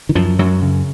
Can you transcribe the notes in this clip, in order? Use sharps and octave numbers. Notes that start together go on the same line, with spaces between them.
D#3
F#2 F3
F#2 F#3
C#3